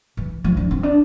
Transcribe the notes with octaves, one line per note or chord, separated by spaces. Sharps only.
E3
F3
D4
C4
D4